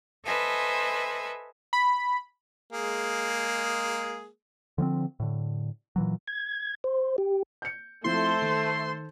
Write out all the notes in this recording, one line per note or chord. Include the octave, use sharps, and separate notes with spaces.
A4 B4 C5 D#5 E5 G#5
B5
G#3 A#3 G#4
D3 F3 B3 C4
A2 D3
A#2 E3 F#3
G#6
C5
G4
G6 C#7
F3 A3 C4 E4 A4 C5 C6
D#3